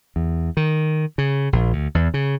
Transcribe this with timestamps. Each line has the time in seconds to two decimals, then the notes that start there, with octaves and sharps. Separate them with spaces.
0.16 E2
0.57 D#3
1.18 C#3
1.53 A#1
1.73 D2
1.95 E2
2.14 C#3